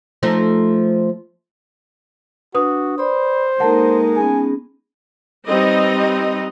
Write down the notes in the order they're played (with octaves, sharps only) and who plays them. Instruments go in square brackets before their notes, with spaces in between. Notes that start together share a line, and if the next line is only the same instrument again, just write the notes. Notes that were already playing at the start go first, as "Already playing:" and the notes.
[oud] F3 A3 D#4
[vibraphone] D4 [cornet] F#4 [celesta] B4 D#6
[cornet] C5 [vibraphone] D5 B5
[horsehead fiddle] G#3 D#4 [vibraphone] A#3 A4 A#4 [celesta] F#5 A5
[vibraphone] B3 C#4 G#4 [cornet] G#5
[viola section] G3 C4 D#4 B4 D#5